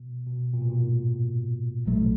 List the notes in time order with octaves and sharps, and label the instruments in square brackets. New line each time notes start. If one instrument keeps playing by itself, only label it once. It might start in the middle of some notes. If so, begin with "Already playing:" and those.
Already playing: [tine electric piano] B2
B2
A#2
B2
A#2
G#2
[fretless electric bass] A#1 A2 F#3 A3